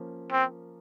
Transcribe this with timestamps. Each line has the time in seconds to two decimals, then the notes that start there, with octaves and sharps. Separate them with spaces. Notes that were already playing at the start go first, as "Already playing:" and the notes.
Already playing: F3 A#3 C#4
0.32 C4